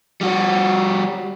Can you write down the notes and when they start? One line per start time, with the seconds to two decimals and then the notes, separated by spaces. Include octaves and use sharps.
0.21 G3 F#4